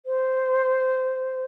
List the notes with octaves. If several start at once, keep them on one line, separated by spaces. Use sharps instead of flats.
C5